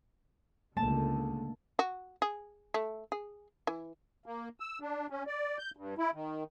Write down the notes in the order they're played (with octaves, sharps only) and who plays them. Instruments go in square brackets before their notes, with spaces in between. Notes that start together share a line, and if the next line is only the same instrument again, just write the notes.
[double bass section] C#2 D3 [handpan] A3 A#3 [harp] A5
[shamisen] F#4
G#4
A3
G#4
E3
[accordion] A#3
E6
D4
C#4
D5
G6
G2
E4
D#3